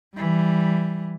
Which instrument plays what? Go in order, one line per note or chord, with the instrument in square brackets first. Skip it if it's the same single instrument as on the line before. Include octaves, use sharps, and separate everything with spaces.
[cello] E3 G3